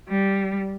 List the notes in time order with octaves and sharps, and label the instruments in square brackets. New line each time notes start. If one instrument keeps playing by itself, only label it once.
[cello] G3